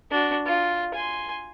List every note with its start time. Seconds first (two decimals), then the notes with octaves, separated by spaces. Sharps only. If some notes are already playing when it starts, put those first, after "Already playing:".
0.11 D4 F#4
0.46 F4
0.94 G#5 C6